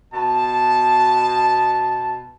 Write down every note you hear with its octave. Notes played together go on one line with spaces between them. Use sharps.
B2 A5